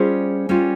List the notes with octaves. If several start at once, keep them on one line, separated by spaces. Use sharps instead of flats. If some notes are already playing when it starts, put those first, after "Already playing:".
Already playing: G3 C#4 F4 G#4 C5
G3 C#4 F4